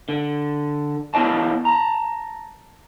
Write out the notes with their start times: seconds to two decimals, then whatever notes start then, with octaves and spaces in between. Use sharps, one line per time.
0.09 D3
1.14 B3 E4 C#5 D#5 A5
1.65 A5 A#5